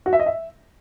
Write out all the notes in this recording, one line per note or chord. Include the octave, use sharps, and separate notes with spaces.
F#4
E5
D#5
E5